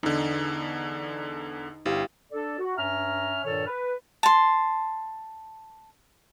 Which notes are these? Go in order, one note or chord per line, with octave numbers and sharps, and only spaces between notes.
E2 D3 D#4
G1 E4 G4 F5
D4 A4 D5
F#4
G2 C#4 E5 A#5 F6
G2 A#2 D#3 A4 C#5 F6
B4
A5 C6